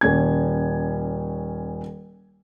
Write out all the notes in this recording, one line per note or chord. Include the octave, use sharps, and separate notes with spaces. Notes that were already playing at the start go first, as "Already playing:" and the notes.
D#1 C#4 G#6